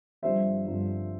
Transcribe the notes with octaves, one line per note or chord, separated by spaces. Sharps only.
G1 G2 F3 C4 C5 E5
G1 G2 F3 C4